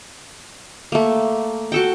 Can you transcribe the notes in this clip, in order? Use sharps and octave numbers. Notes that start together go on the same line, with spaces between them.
A3 A#3
F#4 A4 G5